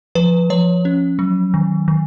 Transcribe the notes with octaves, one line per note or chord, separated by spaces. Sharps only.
F3 B4
F3 C#5
C#4
F#3
D#3
D#3